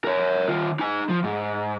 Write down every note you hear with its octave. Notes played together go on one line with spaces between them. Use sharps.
A#4 C#5
D#3 F4
D#4 G#5
F3
G#2